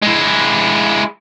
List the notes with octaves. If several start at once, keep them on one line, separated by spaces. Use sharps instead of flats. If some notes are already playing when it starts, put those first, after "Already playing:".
G#3 E4